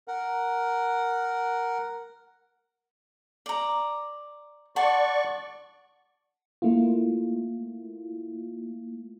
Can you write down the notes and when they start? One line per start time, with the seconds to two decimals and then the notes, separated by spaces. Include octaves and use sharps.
0.08 A#4 F#5
3.46 D5 A#5
4.76 D5 F#5 A5 C6 C#6
6.62 A3 A#3 E4 F4